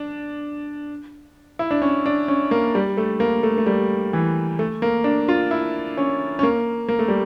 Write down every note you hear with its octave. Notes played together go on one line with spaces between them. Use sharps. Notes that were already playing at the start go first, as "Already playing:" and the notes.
Already playing: D4
E4
D4
C#4
D4
C#4
A#3
G3
A3
A#3
A3
A3
G3
E3
A3
A#3
D4
F4
E4
C#4
C#4
A#3
A#3
A3
G3